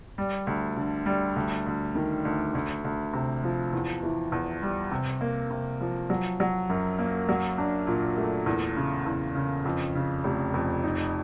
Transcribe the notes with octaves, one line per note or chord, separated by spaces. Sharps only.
G3
D2
D3
G3
D2
D2
D#3
D2
D2
D2
C3
F3
E2
E3
E2
G3
C3
A#3
C3
F3
F#3
F#3
F#2
A#3
F#3
D4
A#2
A3
E2
C#3
E2
C#3
F2
C#3
F1
F2
D#4